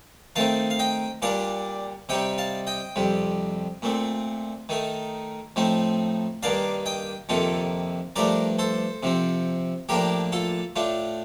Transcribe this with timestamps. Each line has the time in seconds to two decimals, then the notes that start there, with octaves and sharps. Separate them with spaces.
0.36 D#3 A3 C4 D#4 F5 A5
0.70 F5
0.79 D#5 G5
1.22 A#2 G3 D4 D5 F5
2.09 C3 G3 C4 D#4 D#5 G5
2.38 F5 A5
2.67 D#5 G5
2.96 F2 C3 G3
3.82 A#2 A3 C4
4.69 D#3 A3 D#4
5.56 A2 F3 A3 C4 D#4
6.43 G2 D#3 A#3 D4 D5 F5
6.86 D#5 G5
7.29 F2 C3 D#3 A#3 F4 A4
8.16 G2 F3 A3 D4 A#4 D5
8.59 A4 C5
9.03 C3 F3 C4
9.89 A2 F3 A#3 D4 G4 A#4
10.32 F4 A4
10.76 A2 A3 D4 F4